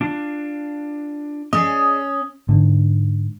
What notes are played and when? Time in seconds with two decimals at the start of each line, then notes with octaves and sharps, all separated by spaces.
0.01 D4 F4
1.53 C#4 G#4 D5 D#5 D#6
2.49 G#2 D3